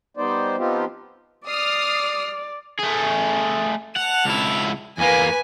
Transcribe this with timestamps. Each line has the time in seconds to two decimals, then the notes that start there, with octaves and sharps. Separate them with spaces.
0.17 G3 B3 D#4 C5 D5
0.58 F3 B3 C4 D#4 F4 G4
1.48 D5 D#6 F6 C7
2.79 A3 G#4
3.97 F#5 A5 F7
4.26 C#2 E4
4.98 E2 A#3 B4 G#5